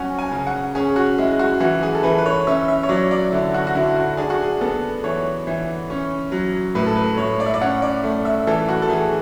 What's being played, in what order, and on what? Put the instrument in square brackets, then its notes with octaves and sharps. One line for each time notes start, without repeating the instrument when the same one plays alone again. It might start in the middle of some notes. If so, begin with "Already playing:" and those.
Already playing: [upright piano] F#3 C#4 F#5 G#5
G#5
C#3
F#5
C#4 G#4
F#4
G#3 E4
F#4
E3 F#4
G#4
A4
E3 B4
B4
C#5
C#4 E5
E5
C#5
F#3 D5
D5
D3 E4
F#4
F#4
D3 E4
F#4
D4 G#4
F#4
G#4
B3 A4
E3 C#5
E3
C#4
F#3
A2 B4
A4
B4
A2 C#5
D5
E5
D5
C#4 F#5
D5
A3
E5
E3 A4
F#4
A4
E3 G#4